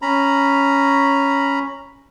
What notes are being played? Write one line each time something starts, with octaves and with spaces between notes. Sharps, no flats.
C#4 A#5 B5